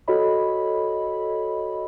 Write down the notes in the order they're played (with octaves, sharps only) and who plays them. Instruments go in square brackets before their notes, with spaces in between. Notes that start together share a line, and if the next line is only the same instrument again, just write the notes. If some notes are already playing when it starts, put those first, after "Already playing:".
[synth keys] F#4 A4 C#5 D#5 B5